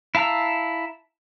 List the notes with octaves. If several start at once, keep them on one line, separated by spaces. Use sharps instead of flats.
E4 F5 A5 A#5 E6